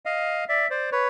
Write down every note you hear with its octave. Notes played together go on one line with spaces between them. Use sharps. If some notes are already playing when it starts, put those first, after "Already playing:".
D#5 F5
D5 E5
C5 D5
B4 C#5